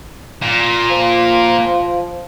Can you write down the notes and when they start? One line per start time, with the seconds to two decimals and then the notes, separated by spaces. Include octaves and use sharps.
0.42 A#2
0.90 F3